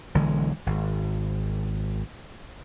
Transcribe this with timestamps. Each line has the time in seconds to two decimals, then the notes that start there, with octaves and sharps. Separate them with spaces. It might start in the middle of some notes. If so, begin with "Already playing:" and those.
0.15 B1 D3 E3 G#3
0.66 G#1